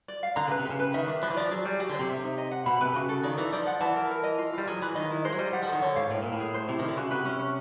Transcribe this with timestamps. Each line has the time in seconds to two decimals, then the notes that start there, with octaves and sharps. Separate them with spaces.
0.08 D5
0.23 F5
0.36 D3 A#5
0.48 C#3 B4
0.59 C3
0.65 G4
0.70 C#3
0.79 B4
0.94 D#3 E5
1.08 D4
1.22 F3 B4
1.30 E3
1.37 F3 D5
1.51 F#3 G#4
1.65 G3 G#4
1.80 F#3 G4
1.90 D3 C5
2.00 C3
2.09 E5
2.23 D#4
2.38 D#5
2.51 F#5
2.66 B2 B5
2.81 C3 B4
2.95 C#3 F#4
3.09 A4
3.24 D#3 D5
3.37 E3 D#4
3.53 F3 D5
3.67 F#5
3.81 E3 A5
3.96 A#4
4.10 A#4
4.24 D#5
4.38 F4
4.53 G3 F4
4.67 F#3 G#4
4.82 E3 B4
4.95 D#3 D#5
5.11 E4
5.25 G#3 C5
5.32 F#3
5.38 G3 D#5
5.53 G3 F#5
5.63 F3 A4
5.72 D#3
5.82 D3 C#5
5.96 G#2 F5
6.10 A2 A#4
6.22 A#2 A#4
6.32 A2
6.40 G#4
6.54 C5
6.69 C3 E4
6.79 D#3 E4
6.88 D3
6.97 C#3 F#4
7.11 C3 B4
7.25 C#4
7.39 C#4